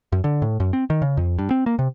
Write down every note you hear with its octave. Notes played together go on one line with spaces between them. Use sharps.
F#2
D3
A2
F#2
C4
D#3
C#3
F2
G2
C4
A#3
C3